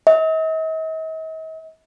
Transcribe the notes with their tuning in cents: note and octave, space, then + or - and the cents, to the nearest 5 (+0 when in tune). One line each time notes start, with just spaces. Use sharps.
D#5 +45